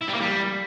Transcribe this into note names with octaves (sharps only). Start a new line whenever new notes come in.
E4
G3
A#3
G3